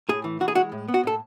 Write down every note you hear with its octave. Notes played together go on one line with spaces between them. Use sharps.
A2 G#4
E3
E3 F#4
G#4
G#3 F#4
A2
B3
F#4
A2 A4